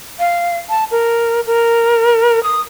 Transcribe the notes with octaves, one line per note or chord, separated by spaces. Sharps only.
F5
A5
A#4
A#4
D#6